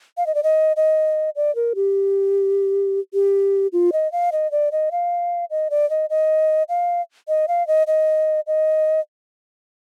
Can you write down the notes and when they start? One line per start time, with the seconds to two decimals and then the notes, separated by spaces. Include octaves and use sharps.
0.17 F5
0.27 D#5
0.35 D5
0.43 D#5
0.76 D#5
1.36 D5
1.56 A#4
1.75 G4
3.14 G4
3.73 F4
3.93 D#5
4.12 F5
4.32 D#5
4.51 D5
4.72 D#5
4.92 F5
5.50 D#5
5.70 D5
5.90 D#5
6.10 D#5
6.69 F5
7.28 D#5
7.48 F5
7.67 D#5
7.87 D#5
8.47 D#5